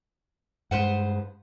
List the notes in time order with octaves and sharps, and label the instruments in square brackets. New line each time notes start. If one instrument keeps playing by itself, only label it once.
[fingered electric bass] G2 G#3 [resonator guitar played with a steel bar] B4 C5 F#5